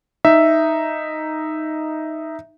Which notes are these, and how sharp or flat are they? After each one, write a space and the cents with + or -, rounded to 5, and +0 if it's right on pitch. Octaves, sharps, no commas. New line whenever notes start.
D#4 +0 E5 +0